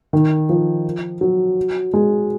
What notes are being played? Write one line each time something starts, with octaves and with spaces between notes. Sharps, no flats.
D#3
F3
F#3
G#3